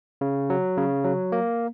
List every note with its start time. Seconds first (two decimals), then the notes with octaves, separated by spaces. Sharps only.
0.21 C#3
0.50 F#3
0.78 C#3
1.05 F#3
1.32 A#3